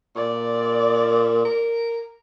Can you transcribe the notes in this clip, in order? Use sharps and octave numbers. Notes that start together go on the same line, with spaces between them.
A#2 D5
A#4